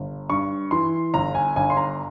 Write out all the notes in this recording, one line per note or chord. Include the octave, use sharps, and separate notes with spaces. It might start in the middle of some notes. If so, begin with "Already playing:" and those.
Already playing: G1
G2 C#6
E3 C6
G1 A#5
G#5
G1 G#5
C6
A#5